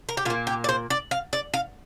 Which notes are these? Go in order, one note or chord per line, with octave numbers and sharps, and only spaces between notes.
A#4
G4
A#2 A#3 F4
G4
D5
C5
D5
F5
D5
F5